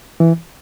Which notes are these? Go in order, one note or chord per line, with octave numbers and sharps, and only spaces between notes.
E3